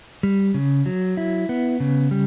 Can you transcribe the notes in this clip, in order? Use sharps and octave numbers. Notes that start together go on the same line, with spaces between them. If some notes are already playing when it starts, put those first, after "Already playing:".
G3
C#3
F#3
E4
B3
C#3
G3